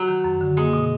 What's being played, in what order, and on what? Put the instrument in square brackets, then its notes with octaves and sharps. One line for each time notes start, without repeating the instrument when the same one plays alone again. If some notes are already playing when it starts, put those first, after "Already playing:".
Already playing: [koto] F#3
[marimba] D#3
F#2
D3
[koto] G#3 [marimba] A#3
[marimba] B2